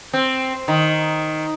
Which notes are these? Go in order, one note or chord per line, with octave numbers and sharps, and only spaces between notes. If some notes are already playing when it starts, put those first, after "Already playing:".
C4
D#3